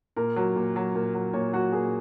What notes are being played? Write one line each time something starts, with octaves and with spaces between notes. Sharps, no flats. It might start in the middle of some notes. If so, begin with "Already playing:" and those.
A#2 A#4
F#3
A#2
F#3
A#2
F#3
A#2 C#5
F#3 F#4
A#2 G#4